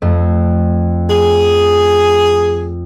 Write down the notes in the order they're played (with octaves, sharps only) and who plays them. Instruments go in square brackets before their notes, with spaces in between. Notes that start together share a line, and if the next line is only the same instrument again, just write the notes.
[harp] F2 A3
[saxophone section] G#4